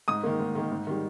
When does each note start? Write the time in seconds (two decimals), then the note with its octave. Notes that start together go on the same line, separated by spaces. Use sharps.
0.08 G#2 D#6
0.23 D#3 A#3
0.40 G#2
0.55 D#3 A#3
0.72 G#2
0.87 D#3 G3